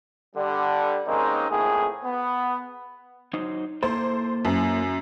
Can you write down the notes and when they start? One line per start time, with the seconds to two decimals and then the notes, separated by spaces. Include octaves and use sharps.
0.35 D3 G3
1.07 D#3 G#3 A#3 C4 C#4 D#4
1.50 F2 A2 A#3 G#4
2.04 B3
3.33 F#3 D#4 C5
3.83 A#3 E4 A4 C5
4.45 F#2